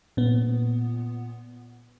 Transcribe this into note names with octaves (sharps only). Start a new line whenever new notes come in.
A#2 B3